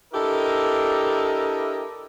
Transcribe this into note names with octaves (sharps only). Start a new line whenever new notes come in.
D4 E4 G4 A4 A#4 D#5